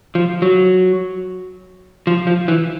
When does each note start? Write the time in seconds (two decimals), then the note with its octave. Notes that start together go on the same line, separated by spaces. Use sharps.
0.15 F3
0.42 F#3
2.07 F3
2.27 F3
2.48 E3